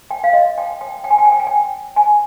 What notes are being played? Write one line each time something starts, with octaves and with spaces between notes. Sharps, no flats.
G5
F5
D#5
G5
G5
G5
G#5
G5
G#5
G5
G#5
G5
G#5